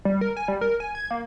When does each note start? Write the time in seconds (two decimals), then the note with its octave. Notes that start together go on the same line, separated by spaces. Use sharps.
0.05 G3
0.21 A#4
0.37 G#5
0.48 G3
0.61 A#4
0.80 G#5
0.95 G#6
1.11 A#3